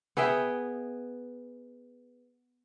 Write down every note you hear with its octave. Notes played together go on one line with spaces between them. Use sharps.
B3 G#4 E5 G5